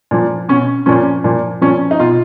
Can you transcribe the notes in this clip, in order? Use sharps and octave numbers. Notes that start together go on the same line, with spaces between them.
A#2 F3
B2 C#4
A#2 F3 C#4
A#2 F3
A#2 F3 C#4
D#4
B2 F4